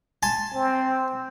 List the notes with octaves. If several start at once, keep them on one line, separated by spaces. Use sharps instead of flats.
G#5 A5 C6
C4